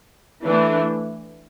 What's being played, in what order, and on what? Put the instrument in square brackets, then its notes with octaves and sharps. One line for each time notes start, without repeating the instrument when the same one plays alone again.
[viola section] E3 A3 D4